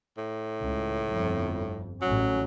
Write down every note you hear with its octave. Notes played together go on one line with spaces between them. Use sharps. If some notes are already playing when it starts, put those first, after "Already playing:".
A2
C#2
G1 F2
A1 F#3 C#4